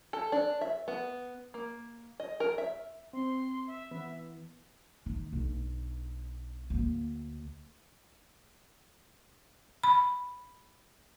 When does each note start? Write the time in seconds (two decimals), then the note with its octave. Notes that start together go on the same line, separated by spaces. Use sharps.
0.13 A4
0.32 D4
0.61 E5
0.88 B3
1.54 A#3
2.20 D#5
2.40 A#4
2.58 E5
3.13 C4 C6
3.67 E5
3.91 E3 B3
5.06 D#3
5.33 B1 G2
6.70 D2 A#3
9.83 B5